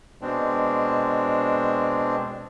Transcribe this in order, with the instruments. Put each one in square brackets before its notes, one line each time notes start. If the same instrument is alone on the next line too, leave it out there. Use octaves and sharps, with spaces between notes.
[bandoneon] B2 G#3 C4 D4